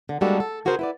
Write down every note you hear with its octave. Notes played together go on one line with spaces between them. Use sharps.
D3
G3 G#3 A#3 D4 F#4 A4
A4
C#3 F#4 G#4 A#4 C5
E4 B4 D5